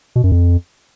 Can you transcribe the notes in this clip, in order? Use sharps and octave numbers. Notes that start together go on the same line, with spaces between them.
B2
F#2
F2